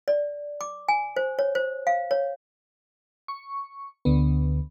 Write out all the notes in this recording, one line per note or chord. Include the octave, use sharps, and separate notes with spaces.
D5
D6
G#5
C5
C#5
C5
F5
C#5
C#6
D2 D3 B3